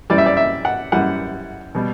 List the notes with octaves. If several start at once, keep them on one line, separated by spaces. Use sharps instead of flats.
F#2 E3 G3 D5
E5
D5
E5
F#5
F#2 E3 G3 F#5
B2 G3